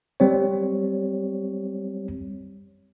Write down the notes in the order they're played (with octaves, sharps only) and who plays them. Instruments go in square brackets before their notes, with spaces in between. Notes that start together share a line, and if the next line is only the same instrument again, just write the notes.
[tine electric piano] G3 C4 C#5